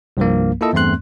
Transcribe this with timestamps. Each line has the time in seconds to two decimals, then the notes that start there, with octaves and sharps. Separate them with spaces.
0.17 C2 G2 F3 A#3
0.61 A#3 E4 F4 A4 D#5
0.73 E2 G2 A3 C4 C6 F#6